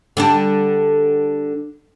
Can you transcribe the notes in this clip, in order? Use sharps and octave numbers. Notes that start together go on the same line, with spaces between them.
D3 G3 D4